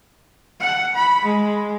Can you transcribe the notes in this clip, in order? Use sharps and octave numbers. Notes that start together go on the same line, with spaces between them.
F#5
B5
G#3